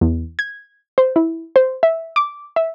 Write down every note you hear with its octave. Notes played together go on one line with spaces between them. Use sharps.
E2
G#6
C5
E4
C5
E5
D6
E5